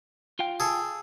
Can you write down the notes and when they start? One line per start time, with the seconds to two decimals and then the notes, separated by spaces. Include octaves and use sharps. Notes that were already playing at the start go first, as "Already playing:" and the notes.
0.39 F4 F5 G5
0.60 G#4 A4